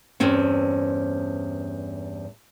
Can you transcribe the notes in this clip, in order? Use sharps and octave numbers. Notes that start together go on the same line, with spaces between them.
E2 G2 C4 C#4